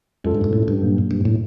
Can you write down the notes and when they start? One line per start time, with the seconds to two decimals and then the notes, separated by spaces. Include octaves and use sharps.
0.24 F#2 G#3 C#4 F4 A4
0.35 G2
0.44 G#2
0.53 A2
0.68 G2
0.82 A#2 F#3 A#3
1.11 G2
1.25 A2